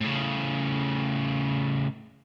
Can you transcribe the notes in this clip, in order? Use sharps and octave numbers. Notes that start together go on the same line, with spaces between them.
A2 C#3